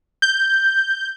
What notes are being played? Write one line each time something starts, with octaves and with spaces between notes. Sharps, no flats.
G6